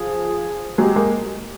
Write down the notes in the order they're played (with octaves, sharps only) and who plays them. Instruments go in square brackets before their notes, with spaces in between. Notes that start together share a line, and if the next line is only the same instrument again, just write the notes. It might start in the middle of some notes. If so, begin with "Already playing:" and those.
Already playing: [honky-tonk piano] F3 [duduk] G#4
[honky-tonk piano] F#3 G#3 [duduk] G4
[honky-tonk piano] G#3 A#3